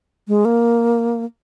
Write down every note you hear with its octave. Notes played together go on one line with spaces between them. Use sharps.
G#3
A#3